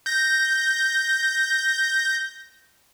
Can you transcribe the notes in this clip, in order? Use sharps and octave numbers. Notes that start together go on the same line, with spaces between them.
G6 A#6